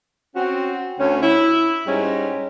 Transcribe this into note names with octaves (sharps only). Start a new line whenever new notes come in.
C4 C#4 F#4
D2 C#4
E4
G#2 G3 G#3 C#4